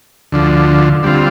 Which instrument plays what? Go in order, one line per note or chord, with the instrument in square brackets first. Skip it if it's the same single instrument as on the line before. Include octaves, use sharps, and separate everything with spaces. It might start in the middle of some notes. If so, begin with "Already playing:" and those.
[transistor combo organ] D2 D3 F3
D3 G3 C4 F4